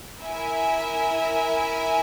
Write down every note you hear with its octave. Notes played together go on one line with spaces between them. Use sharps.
E4 A#4 E5 G#5